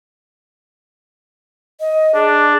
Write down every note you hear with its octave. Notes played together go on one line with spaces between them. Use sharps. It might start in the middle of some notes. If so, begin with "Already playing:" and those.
D#5
D4 G#4